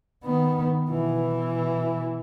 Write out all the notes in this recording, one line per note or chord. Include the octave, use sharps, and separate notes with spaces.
D#3 B3
B2 E3